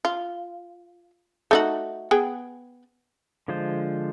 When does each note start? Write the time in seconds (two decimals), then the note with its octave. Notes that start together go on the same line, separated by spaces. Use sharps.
0.05 F4
1.51 A3 D#4 F#4
2.11 B3 G#4 G5
3.48 D3 F3 G#3 F4 C5